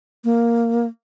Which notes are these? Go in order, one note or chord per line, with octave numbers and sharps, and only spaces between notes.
A#3